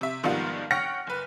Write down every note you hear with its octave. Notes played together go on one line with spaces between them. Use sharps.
C3 E5
G#2 D#3 F3 G3 B3 F4
C#5 F#5 G5 F6 A#6 C#7
F#1 B4